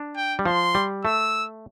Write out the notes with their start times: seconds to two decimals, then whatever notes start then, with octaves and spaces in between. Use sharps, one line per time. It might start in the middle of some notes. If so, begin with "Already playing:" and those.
Already playing: D4
0.17 G5
0.39 G3
0.46 F3 C6
0.75 G3
1.05 A3 E6